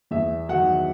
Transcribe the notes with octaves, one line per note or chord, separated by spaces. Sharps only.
E2 E5
D#3 F#3 F#5